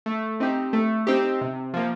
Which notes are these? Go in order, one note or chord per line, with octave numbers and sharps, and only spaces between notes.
A3
C4 D#4 G4
A3
C4 D#4 G4
C3
F3 A#3